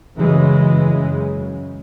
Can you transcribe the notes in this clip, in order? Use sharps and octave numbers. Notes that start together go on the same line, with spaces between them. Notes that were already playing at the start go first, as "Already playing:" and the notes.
F#2 C#3 E3 G#3
F#2 C#3